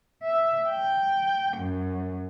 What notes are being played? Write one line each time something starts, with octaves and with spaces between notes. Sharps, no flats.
E5
G5
F#2